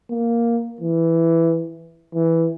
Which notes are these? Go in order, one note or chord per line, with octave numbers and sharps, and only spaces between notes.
A#3
E3
E3